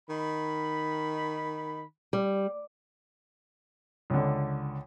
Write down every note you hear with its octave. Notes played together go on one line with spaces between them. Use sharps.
D#3 B5
G3
C#2 D3